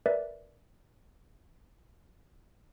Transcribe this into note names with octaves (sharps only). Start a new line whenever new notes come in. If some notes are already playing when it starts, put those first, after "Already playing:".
A#4 B4 D5 E5